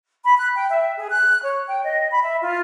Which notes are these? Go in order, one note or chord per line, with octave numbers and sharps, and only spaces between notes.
B5
F#6
G5
E5
G#4
F#6
C#5
G5
D#5
B5
E5
F4